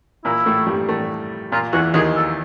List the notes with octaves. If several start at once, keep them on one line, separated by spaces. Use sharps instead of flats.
A#2 A#3 E4
A2 A3
G2 G3
A2 A3
A#2 A#3 F4
E2 E3 F#4
D#2 D#3 G#4
A4